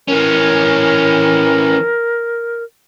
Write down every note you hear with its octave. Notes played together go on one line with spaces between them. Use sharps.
E3 C#4 A#4